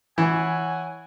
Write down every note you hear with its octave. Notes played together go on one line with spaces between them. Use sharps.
E3 C#5 F#5 G#5